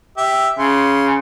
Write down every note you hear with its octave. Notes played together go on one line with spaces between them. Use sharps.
G4 E5
C#3 C6